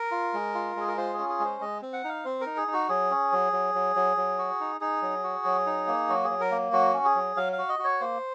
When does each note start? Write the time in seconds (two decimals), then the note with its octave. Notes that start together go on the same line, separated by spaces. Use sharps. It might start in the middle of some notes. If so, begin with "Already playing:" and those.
Already playing: A#4
0.11 F4
0.34 G#3
0.54 F4
0.76 G#3 G#4
0.88 A#4
0.97 F4 C5
1.13 G#4
1.18 C#4
1.29 G#4
1.40 G#3
1.45 C5
1.61 G#3 D#5
1.82 C4
1.93 F#5
2.04 D#4 F5
2.25 C4 C5
2.41 A#4
2.46 D#4
2.57 G#4
2.68 D#4
2.73 F#4
2.89 F#3 G#4
3.10 C#4
3.32 F#3
3.53 F#3
3.75 F#3
3.96 F#3
4.17 F#3
4.38 F#4
4.60 D#4
4.81 D#4 G#4
5.02 F#3
5.24 F#4
5.45 F#3
5.66 D#4
5.87 A#3
6.09 F#3 F#4
6.24 G#4
6.30 F#3
6.41 A#4
6.51 A#3
6.73 F#3 F#4
6.94 C#4
7.05 G#4
7.15 F#3
7.37 F#3 F5
7.53 F5
7.58 F#4
7.69 D#5
7.79 F#4
7.84 C#5
8.01 A#3 C5